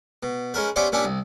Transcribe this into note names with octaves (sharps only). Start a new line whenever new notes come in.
B2
G#3 C#4 A#4 B4
B3 C#4 E4 G4 C5 D5
A#2 C#4 D4 E4 G4
C2